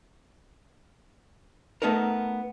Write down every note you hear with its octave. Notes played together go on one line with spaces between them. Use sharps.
A3 B3 D#4 A4 A#4